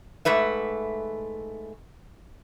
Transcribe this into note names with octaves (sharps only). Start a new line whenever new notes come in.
G#2 A3 B4 E5